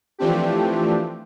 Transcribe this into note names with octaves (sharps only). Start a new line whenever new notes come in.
E3 F3 A3 C4 D4 G4